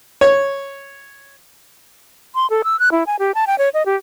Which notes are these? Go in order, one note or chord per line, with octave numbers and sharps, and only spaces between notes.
C#5
C6
A4
E6
F#6
E4
G#5
G4
A5
G5
C#5
D#5
G4